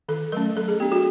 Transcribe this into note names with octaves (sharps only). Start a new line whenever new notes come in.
D#3 A4
F#3 A3 C#4 A#4
F#3 A4
G#4
B3 D4 G4
F#4